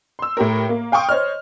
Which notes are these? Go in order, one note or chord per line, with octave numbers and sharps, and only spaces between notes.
C6 E6
A2 G4 A#4
A#3
F5 G5 C6 C#6 D#6
C5 C#5 D#5 F6